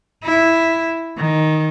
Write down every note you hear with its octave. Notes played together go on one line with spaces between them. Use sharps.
E4
D#3